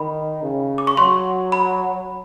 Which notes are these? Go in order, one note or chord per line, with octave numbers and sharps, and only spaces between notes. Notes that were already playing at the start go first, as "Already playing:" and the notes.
Already playing: D#3 B5
C#3
D6
C#6
F#3 C6
B5